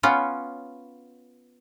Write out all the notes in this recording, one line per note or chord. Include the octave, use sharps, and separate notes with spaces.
B3 C#4 F4